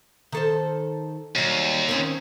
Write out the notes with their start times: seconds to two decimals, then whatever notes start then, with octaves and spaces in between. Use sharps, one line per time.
0.32 D#3 A4 C5
1.35 D#2 F#3 G3
1.89 D#3 C4 C#4